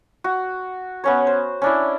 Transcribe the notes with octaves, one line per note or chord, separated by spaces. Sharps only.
F#4
B3 C#4 C#5
C5
C#4 D4 E4